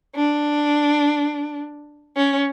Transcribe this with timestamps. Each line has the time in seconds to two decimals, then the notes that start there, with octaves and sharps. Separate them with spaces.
0.16 D4
2.17 C#4